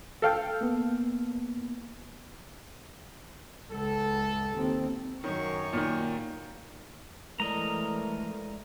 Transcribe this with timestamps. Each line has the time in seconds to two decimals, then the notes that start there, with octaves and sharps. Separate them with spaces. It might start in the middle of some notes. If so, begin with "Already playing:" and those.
0.22 A4 F5 G5
0.61 A#3 B3
3.72 C#2 A4
4.57 D#2 C4
5.24 F#2 D#3 C#5 C#6
5.73 A#2 D#3
7.40 E3 G#3 A3 A#4 D5 D#5 A#5